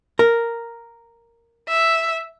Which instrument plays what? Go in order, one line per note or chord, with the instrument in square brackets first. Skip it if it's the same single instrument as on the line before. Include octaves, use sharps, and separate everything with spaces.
[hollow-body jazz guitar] A#4
[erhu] E5